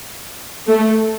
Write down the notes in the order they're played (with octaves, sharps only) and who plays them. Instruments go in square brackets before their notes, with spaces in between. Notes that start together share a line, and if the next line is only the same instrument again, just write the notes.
[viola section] A3